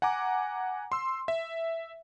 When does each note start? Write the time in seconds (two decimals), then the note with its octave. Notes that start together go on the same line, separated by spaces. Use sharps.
0.02 F#5 G#5 A#5 D6
0.92 C6 E6
1.28 E5